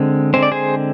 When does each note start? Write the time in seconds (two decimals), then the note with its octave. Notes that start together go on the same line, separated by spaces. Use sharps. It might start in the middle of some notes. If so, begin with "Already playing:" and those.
Already playing: D3 G#3 C4
0.34 D3 G#3 C4 C5
0.43 D5
0.52 G#4 C5